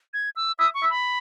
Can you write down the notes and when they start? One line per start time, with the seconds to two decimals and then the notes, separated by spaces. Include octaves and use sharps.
0.14 G#6
0.36 E6
0.59 E5 D#6
0.74 C#6
0.83 E5
0.90 B5